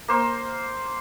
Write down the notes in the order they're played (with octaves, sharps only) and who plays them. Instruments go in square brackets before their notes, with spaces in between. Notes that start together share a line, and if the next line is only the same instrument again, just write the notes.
[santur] A#3 C5